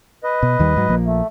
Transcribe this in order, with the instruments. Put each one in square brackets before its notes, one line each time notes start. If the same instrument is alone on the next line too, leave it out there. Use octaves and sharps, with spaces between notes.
[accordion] B4 D#5
[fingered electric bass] B2
D#2 D#3 G3
G#2 F#3
A#1 F3 A#3
[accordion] A3